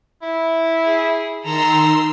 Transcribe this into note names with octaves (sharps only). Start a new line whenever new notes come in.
E4
G#4
D#3 A4 A#5 C6 E6